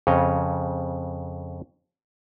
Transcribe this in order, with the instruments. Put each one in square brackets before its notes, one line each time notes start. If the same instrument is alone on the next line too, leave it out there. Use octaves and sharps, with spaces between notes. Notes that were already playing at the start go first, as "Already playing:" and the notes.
[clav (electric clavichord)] F2 C#3 C#5 D#5